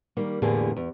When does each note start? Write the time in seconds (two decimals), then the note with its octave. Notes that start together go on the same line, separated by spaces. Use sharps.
0.17 D#3 G3 A#3
0.42 E2 A2 D3 A#3 G4 G#4
0.76 E2